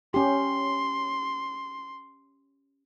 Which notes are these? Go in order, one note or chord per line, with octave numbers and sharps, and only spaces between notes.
C#4 G4 C6